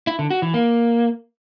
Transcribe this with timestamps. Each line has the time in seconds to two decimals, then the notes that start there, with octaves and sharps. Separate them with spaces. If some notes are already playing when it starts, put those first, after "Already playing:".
0.07 E4
0.19 D3
0.30 F#4
0.42 E3
0.54 A#3